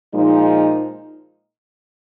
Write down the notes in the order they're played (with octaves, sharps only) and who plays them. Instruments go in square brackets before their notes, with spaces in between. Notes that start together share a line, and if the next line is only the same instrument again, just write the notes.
[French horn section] A#2 F3 G#3 D#4